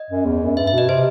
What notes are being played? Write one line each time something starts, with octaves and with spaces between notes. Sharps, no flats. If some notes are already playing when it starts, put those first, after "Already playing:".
Already playing: D#5
F#2
E2
F#2
G2 E5
E5
B2 D#5
C3 C5